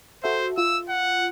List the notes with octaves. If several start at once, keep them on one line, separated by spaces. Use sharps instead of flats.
F#4 A4 C5 E5
F4 E6
F#5